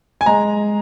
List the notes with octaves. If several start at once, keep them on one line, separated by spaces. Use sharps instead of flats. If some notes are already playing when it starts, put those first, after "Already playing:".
G#5
G#3 A#5